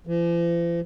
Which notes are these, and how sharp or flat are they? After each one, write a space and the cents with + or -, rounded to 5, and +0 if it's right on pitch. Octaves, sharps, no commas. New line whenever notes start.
F3 -45